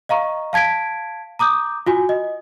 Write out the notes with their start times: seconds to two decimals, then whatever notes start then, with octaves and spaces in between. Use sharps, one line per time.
0.09 D#5 F5 A#5 C#6
0.53 F5 A5 G#6 B6 D7
1.39 A#5 D6 D#6 G6
1.86 F4 F#4 G#5
2.09 D#5